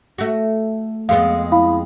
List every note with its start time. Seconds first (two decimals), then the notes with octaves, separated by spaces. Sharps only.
0.18 A3 F#4
1.09 F2 G#3 B3 F5
1.52 E4 F5 B5